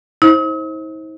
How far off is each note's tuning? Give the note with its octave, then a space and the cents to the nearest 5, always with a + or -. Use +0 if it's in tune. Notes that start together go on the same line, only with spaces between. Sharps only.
D#4 +45 C5 +25